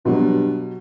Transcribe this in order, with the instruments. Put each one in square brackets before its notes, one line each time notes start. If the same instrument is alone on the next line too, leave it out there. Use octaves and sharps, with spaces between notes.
[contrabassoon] G2 [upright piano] B2 F#3